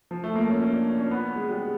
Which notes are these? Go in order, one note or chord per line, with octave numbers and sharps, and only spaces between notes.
F3
A3
A#3
C#4
C#4
D4
C#4
C#4
B3
G#3
G3
G#3